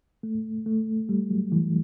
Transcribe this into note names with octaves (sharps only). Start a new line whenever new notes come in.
A3
A3
G3
F#3
E3